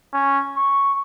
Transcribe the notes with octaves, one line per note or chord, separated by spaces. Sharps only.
C#4
C#6